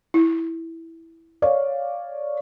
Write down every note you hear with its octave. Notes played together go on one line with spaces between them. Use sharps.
E4
C#5 D5 F5